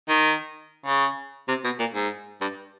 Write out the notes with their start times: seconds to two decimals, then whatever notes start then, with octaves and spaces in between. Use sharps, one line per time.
0.09 D#3
0.86 C#3
1.48 C3
1.64 B2
1.79 A#2
1.94 G#2
2.41 G2